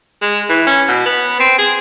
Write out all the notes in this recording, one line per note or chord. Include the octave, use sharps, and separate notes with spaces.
G#3
E3
C#4
B2
B3
C4
G#4